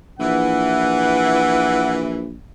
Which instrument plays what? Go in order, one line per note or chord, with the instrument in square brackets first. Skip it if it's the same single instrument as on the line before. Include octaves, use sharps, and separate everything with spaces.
[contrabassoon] A#1 [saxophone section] E3 [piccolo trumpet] F#5